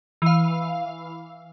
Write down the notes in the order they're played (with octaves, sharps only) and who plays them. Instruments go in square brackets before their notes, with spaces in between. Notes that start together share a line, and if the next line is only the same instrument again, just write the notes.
[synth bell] E3 F5